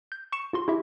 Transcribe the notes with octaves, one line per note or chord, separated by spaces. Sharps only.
G6
C#6 C#7 E7
F4 F#4 C6
E4 F#4 G4 E5